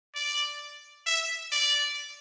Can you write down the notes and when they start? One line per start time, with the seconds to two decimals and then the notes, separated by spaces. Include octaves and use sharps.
0.15 D5
1.06 E5
1.52 D5